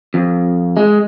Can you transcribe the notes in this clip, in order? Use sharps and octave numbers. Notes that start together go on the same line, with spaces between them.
F2
G#3